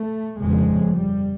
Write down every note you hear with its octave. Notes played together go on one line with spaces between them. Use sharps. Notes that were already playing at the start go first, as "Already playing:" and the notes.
Already playing: A3
G1 F2 C#3 G#3
G3